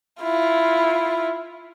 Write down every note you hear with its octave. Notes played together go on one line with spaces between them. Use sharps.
E4 F4